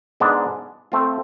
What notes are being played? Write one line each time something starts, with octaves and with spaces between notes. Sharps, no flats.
G#2 G#3 B3 D4
A3 C4 F4